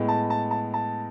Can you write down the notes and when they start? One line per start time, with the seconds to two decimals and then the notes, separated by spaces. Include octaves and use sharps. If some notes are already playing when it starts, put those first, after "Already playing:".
Already playing: A2 G#3 B3
0.08 A5
0.30 A5
0.51 A5
0.74 A5